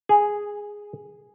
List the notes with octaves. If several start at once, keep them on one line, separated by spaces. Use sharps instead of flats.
G#4